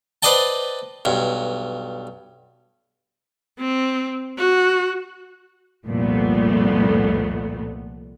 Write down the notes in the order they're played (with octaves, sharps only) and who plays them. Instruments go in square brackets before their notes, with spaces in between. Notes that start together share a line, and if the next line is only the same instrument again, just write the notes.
[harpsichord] B4 C5 D5 D#5 G5 A5
B1 G2
[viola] C4
F#4
[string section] C2 F2 A#2 A3 B3